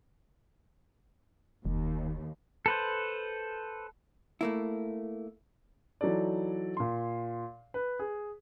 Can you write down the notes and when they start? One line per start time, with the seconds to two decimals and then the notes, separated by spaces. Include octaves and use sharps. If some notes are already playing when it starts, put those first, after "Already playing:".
1.65 F1 D#2
2.66 A4 B4 C5
4.41 A3 A#3 E4
6.01 E3 F#3 D#4 A4 D5
6.77 A#2 C6
7.74 B4
7.99 G#4